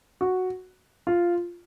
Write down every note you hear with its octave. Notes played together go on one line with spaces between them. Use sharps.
F#4
F4